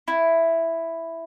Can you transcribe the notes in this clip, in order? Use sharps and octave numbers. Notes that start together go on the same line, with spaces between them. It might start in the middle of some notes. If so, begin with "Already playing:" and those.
E4